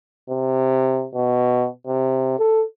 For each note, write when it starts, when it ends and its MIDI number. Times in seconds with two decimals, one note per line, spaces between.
0.30 1.06 48
1.15 1.67 47
1.86 2.37 48
2.38 2.64 69